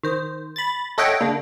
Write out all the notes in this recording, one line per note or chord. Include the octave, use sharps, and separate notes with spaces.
D#3 C5
B5 A6
A4 C#5 D#5 E5 F#5 G5
C#3 A#3 D4